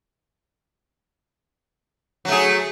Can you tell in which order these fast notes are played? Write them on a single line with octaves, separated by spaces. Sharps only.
F#3 A3 G#4